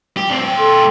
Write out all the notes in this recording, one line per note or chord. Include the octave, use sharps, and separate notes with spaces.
G4
C4 D4
A#2 G5
A4 C6